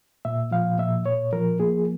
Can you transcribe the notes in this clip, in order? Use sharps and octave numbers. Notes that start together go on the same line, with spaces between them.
A#2 E5
F3 F5
A#2 E5
A#2 C#5
F3 A#4
A#3 G#4